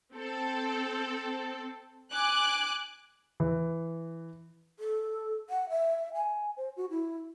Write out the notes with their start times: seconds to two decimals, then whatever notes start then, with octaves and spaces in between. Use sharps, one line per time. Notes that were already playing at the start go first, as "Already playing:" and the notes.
0.13 C4 A4
2.13 G#5 D6 F#6
3.40 E3
4.79 A4
5.50 F#5
5.70 E5
6.15 G#5
6.57 C5
6.77 F#4
6.90 E4